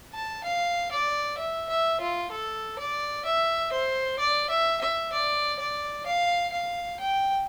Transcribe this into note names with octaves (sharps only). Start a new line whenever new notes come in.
A5
F5
D5
E5
E5
F4
A4
D5
E5
C5
D5
E5
E5
D5
D5
F5
F5
G5